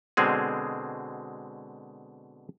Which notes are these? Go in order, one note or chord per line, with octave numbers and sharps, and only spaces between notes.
B2 D3 G#3 C4 G#4